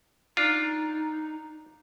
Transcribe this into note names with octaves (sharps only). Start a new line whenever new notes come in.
D4 D#4 F4